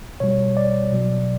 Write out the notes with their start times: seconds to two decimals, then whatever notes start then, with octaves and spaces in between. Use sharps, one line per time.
0.20 B2 G3 C#5
0.57 D5
0.92 B2 F#3